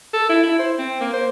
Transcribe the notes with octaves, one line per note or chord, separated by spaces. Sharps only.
A4
E4
E4
C5
C4
A#3
C5